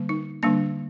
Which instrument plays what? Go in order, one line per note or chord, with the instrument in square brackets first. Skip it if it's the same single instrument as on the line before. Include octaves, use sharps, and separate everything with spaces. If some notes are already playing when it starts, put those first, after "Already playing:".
Already playing: [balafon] D3 G3 A#3
D#4
D3 G3 A#3 D4